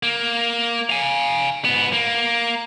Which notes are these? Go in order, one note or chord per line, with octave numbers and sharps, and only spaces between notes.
A#3
F5 G#5
G#2 B3
A#3